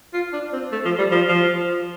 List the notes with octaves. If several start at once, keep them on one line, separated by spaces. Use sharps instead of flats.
F4
D4
C4
A3
F3
G3
F3
F3